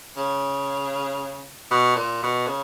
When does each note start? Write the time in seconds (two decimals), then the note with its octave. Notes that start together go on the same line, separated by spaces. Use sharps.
0.17 C#3
1.71 B2
1.96 A#2
2.23 B2
2.47 C#3